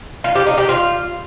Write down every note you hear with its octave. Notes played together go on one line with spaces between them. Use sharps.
F4
G4
D#4
G4
F4